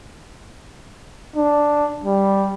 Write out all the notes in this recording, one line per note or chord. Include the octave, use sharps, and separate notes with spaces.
D4
G3